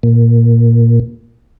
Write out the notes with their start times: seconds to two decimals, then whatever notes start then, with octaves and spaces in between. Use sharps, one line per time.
0.03 A#2